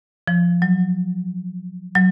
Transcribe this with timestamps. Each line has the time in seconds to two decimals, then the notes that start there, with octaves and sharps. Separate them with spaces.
0.28 F3
0.62 F#3
1.95 F#3